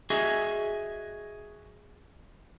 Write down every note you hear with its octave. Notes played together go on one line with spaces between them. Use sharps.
F#4 G#4 D#5 E5